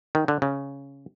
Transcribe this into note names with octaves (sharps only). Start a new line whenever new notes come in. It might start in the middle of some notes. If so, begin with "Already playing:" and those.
D#3
D3
C#3